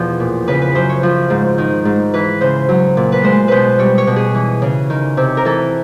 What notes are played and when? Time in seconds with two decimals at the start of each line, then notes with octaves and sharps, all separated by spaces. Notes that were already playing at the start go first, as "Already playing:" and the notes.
Already playing: E2 B2 F3 A4
0.20 A#2
0.48 C#3 B4
0.62 B4
0.75 F#2 C5
0.89 C#5
1.03 F3
1.30 G#2
1.58 D#3
1.85 G#2
2.14 E3 B4
2.41 C#3 C5
2.69 F#3
2.97 A#2
3.12 B4
3.23 G#3 C5
3.48 B2 B4 C5
3.79 G3 C#5
3.98 C#5
4.07 B2
4.16 G#4
4.35 E3
4.62 C#3
4.90 D#3
5.17 C3
5.37 A#4
5.45 E3 A4